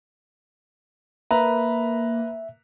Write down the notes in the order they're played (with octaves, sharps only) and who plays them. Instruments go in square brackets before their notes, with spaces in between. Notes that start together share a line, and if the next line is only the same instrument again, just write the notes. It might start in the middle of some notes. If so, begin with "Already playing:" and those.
[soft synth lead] A#3 [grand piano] B4 A#5 [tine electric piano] E5